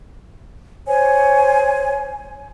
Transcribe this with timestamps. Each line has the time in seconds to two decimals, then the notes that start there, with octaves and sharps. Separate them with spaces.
0.87 C5 C#5 G#5